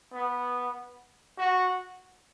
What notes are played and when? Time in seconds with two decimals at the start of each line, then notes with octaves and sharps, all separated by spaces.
0.13 B3
1.38 F#4